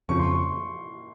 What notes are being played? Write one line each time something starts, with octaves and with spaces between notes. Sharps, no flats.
F2 C#3 F3 C#6
C6
C#6